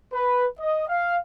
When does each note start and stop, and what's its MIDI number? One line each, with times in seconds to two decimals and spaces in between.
0.14 0.45 71
0.60 0.88 75
0.88 1.17 77